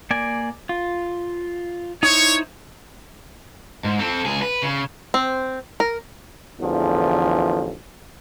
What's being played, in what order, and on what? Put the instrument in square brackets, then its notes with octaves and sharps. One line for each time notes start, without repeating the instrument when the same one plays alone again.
[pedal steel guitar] A#3 D5 G#5
F4
[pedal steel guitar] D#4 E4 C5 [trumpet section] C#5
[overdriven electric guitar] G#2
C4 A4
C#2 G#4
B4
C#3
[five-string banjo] C4
A#4
[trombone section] A1 E2 D3 F3